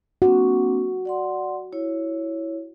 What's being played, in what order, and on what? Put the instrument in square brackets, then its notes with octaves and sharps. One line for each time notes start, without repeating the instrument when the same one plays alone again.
[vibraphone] A#3 C4 D4 [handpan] F#4
[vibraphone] D5 F#5 C6
E4 C#5